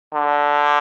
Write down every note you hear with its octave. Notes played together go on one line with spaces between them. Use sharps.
D3